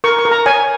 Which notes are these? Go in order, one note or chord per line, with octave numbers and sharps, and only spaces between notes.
A#4 C#6
C#6
A#4
A#5
C#5 G#5